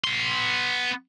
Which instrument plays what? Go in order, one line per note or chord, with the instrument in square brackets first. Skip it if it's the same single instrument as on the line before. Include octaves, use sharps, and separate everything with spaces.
[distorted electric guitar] B3 C6